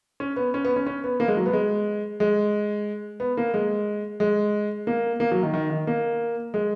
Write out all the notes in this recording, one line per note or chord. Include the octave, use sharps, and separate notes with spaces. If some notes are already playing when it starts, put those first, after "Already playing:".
C#4
B3
C#4
B3
C#4
C#4
B3
A#3
G#3
F#3
B3
G#3
G#3
B3
A#3
G#3
G#3
A#3
A#3
F#3
D#3
D#3
D#3
A#3
G#3